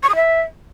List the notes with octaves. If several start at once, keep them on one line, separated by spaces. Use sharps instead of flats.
C#6
D#6
E5